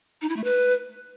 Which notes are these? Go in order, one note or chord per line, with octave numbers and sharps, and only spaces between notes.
D#4
E4
A3
B4